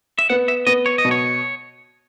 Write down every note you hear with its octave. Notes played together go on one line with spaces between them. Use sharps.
E5
B3 F#5
E5
B3 D#5
C#5
D#5
B2
C#5